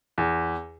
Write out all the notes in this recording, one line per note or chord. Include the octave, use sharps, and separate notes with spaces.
E2